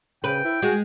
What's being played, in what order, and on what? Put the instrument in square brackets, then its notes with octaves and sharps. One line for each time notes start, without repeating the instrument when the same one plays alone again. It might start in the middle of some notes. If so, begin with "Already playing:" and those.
[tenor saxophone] C#3 [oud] B4 [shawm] G5
[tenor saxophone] E4
[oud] G#3 [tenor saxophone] F#4